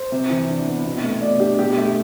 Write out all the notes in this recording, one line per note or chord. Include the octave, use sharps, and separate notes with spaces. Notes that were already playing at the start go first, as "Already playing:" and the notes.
Already playing: C5
C3
E3
D4
B3
B2
A3
B2 D5
D4 G4
B2 G4
A3